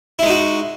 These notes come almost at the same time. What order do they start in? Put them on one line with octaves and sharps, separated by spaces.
E4 G#3 D#4 F#4